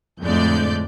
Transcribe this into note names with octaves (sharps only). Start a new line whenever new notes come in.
F2 A2 D3 G#3 D5 G6